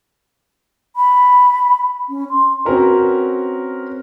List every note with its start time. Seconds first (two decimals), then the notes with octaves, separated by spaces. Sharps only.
0.96 B5
2.09 C#4
2.30 C6
2.65 C4 C#4 F#4 A#4 B4